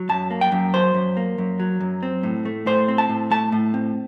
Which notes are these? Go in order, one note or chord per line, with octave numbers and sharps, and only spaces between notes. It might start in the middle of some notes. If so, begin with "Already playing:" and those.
Already playing: F#3
F#2 A5
A#3
G5
F#2
F#3 C5
F#2
A#3
F#2
F#3
F#2
C4
A2
A3
A2 C5
C4
A5
A2
A3 A5
A2
C4